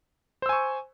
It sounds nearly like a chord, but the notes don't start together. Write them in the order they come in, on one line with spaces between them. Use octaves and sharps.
C5 E6 G#5 C#6